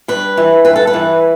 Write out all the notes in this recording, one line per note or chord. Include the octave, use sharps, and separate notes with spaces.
G2 B4
E3
G2 B4
A4
B4
E3